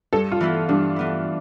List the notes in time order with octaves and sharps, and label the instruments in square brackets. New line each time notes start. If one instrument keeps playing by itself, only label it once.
[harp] G2 [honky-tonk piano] A4
[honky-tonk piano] F4
[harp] E3 B3 E4
[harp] G2 [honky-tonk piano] D4
[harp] E3 B3 E4